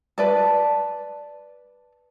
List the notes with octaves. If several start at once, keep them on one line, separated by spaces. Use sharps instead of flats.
B4 D5 A5